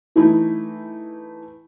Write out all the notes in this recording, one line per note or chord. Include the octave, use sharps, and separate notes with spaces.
E3 A3 D#4 E4